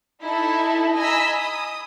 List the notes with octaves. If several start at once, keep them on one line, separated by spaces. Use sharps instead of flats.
D#4 E4 A4 E5
D#5 G#5 A#5 B5 E6 B6
D#6